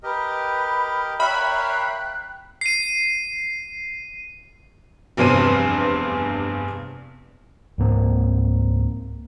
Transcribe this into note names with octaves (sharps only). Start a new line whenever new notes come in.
G4 A#4 B4 D#5
A#4 C#5 E5 F5 G5 B5 F#6
C7 D#7
F1 E2 G2 C5 G#5 D#7
C#2 G#2 A#3 C4